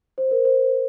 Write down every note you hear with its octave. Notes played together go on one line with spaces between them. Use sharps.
C5
A#4
C5